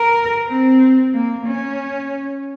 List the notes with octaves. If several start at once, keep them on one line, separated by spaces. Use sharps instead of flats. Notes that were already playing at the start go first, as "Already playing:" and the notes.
Already playing: A#4
C4
A#3
C#4